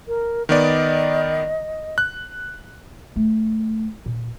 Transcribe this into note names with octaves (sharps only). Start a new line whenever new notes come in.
A#4
D#3 B3 D5 D#5
F#6
A3
A#2